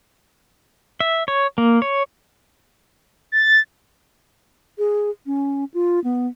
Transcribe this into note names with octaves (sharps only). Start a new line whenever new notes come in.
E5
C#5
A#3
C#5
A6
G#4
C#4
F4
B3